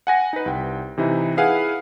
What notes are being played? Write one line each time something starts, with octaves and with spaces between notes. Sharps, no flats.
F#5 G#5 A#6
D#4 B4
C2 G5
C3 E3 D#4 E4
E4 G#4 B4 F5 F#5 G#5